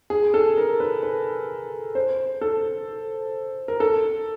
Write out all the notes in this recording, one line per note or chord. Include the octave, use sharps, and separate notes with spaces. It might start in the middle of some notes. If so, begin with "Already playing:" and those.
G#4
A4
A#4
B4
B4
C5
A4
A#4
A4